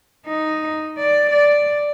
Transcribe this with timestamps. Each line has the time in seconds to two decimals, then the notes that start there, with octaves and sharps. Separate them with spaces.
0.26 D#4
0.97 D5
1.31 D5